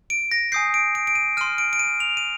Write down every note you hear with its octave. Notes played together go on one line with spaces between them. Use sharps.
D7
A#6
G#5 D#6 G6 C7
D7
D7
D7
D#7
C6 F6 D#7
D7
D7
D#7
F7
D#7